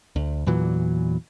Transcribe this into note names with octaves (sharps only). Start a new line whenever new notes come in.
D2
E2 A#2 E3 F#3